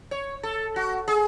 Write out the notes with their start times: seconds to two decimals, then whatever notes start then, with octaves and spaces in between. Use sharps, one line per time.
0.11 C#5
0.43 A4
0.76 F#4
1.08 G#4